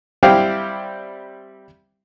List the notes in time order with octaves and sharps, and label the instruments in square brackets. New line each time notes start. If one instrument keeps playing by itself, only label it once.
[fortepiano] G3 C4 E4 G4 F5 G5